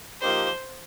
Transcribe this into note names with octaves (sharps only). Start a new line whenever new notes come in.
F3 A#3 D#4 G4 C5